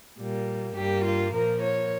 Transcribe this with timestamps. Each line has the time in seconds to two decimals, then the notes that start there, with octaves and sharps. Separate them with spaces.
0.18 A#2 G3 A#3
0.76 G2 G3 A#3 G4
1.05 F4
1.34 A#2 F3 A#3 A#4
1.62 C#5